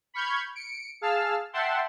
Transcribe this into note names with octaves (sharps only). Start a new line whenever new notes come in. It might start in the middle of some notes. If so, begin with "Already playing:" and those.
B5 C#6 F6 G6 G#6
C#7 D7
G#4 F5 A5 E6 F6
E5 F#5 G5 A5 C6